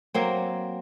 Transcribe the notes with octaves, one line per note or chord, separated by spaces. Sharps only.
F#3 A#3 C4